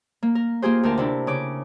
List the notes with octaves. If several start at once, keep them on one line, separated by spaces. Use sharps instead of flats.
A#3
A#4
A#3 F4 G4 G#4 C5
D2 G4 A#4 A5
C3 D4 E4
C#3 D6